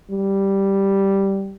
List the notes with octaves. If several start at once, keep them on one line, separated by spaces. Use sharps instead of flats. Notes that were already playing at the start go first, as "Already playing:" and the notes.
G3